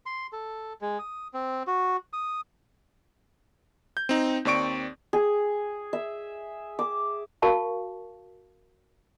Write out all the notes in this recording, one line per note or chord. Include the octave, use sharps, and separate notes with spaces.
C6
A4
G#3
D#6
C4
F#4
D#6
G6
C4 D#4
D#2 C4 D5 C#6 D7
G#4
E5
D6
F#4 A#4 F5 A5 C#6